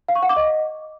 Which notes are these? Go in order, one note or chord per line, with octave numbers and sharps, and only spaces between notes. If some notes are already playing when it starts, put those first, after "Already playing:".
F5
C#6
F#5
D6
D#5